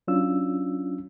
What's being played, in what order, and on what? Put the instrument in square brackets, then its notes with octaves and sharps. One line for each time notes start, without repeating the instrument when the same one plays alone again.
[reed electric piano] F#3 C#4 D4 F4 E6